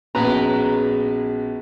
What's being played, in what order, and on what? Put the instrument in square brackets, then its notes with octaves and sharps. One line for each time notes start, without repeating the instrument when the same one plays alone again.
[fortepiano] A#1 B4 A#5 [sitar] G#3 [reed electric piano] B3 C#4 F#4